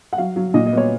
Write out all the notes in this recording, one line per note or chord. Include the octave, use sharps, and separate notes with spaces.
F#5
F#3 F5
F#3
A#2 D#5
D#5
B3 C#5